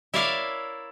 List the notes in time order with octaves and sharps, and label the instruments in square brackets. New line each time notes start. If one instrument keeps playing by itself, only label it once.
[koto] E4 A#4 C#5 D5 E5 F5